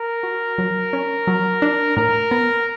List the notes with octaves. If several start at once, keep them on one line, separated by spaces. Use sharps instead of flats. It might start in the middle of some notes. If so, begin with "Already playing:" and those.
Already playing: A#4
F#4
F#3
C#4
F#3
D4
A2 A#4
B3